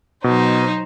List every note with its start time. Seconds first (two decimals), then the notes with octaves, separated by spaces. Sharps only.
0.24 B2 F#3 D#4 C5